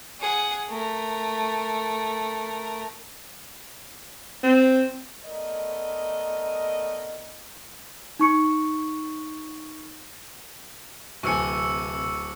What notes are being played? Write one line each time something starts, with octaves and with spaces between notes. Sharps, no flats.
G#4 F#5
A3 A#4
C4
A3 B3 A#4 D5 D#5
D#4 C#6 C#7
D1 C3 B4 G#5 C#6 E6 C#7